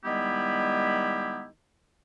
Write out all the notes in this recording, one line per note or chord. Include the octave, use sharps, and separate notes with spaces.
D#3 G3 G#3 B3 E4 G4